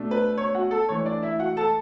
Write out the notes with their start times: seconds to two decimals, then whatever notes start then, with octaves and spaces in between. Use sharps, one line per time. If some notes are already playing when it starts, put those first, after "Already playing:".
Already playing: B2 A3 D4
0.11 B4
0.38 C#5
0.55 F#4 F#5
0.71 A4 A5
0.89 E3 A3 D4 C#5
1.05 D4 D5
1.23 E4 E5
1.39 F#4 F#5
1.57 A4 A5